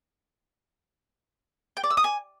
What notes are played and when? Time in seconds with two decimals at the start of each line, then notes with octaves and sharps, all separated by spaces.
1.77 G5
1.84 D5
1.90 E6
1.97 D#6
2.04 G#5